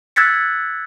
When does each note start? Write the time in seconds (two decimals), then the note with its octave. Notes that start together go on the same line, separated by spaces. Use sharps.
0.16 E6 F#6 G#6 A6 B6 C#7